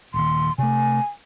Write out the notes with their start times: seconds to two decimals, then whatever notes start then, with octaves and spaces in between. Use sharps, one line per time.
0.14 D#1 D#2 C6
0.58 C3 A3 G#5